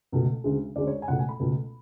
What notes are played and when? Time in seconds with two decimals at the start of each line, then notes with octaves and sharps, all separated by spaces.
0.12 C#2 B2 A3
0.44 D2 C#3 G#3
0.76 D2 C#3 G#3 D5
0.87 C#5
1.02 G#5
1.08 C#2 B2 A3 F#5
1.19 G#5
1.29 B5
1.40 C#2 B2 A3